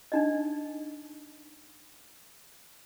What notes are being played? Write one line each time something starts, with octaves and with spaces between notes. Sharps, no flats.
D4 D#4 D#5